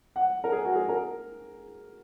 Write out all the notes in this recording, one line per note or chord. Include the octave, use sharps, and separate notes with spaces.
F#5
A#4
G#4
F#4
G#4
A#4